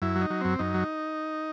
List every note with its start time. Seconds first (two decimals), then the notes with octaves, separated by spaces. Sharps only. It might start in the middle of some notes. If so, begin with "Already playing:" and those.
0.02 F#2 E4
0.16 F#3
0.21 D#4
0.30 F#3
0.41 F#2 C4
0.59 F#2 D#4
0.74 F#3